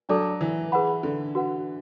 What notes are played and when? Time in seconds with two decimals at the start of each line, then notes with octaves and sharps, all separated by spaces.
0.09 F#3 D4 A4 D5 A5 D6
0.41 E3
0.72 G#4 B4 F#5 B5
1.03 D3
1.35 F#4 B4 F#5